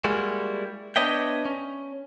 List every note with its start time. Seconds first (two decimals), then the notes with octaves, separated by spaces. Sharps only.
0.04 G3 G#3 A#3 E4 F#4
0.96 B3 D4 C#5 D#5 E5 G5
1.45 C#4